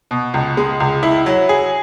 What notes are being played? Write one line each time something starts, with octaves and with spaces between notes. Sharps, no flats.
B2
C#2
G#3
C#2
E4
F#3
G#4